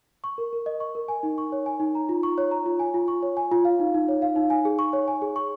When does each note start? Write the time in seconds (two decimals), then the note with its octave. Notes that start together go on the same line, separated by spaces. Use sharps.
0.24 C#6
0.38 A#4
0.53 A#4
0.66 D#5
0.80 C#6
0.95 A#4
1.08 G#5
1.23 D#4
1.38 C#6
1.52 C#5
1.66 G#5
1.80 D#4
1.95 A#5
2.09 F4
2.23 C#6
2.38 C#5
2.51 A#5
2.66 F4
2.79 G#5
2.94 F4
3.08 C#6
3.23 C#5
3.37 G#5
3.51 F4
3.65 F5
3.80 D#4
3.94 D#4
4.08 C#5
4.22 F5
4.36 D#4
4.50 G#5
4.65 G#4
4.79 C#6
4.93 C#5
5.08 G#5
5.22 G#4
5.36 C#6